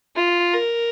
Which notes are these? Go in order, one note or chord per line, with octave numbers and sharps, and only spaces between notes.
F4
A#4